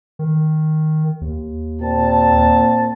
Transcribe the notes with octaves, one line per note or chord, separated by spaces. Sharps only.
D#3
D#2
A#2 C4 A5